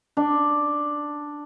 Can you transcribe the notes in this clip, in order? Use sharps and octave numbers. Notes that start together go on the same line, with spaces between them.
D4